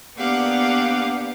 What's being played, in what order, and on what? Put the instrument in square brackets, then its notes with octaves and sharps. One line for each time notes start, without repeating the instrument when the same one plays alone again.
[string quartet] A#3 B3 D4 G4 F5 F#5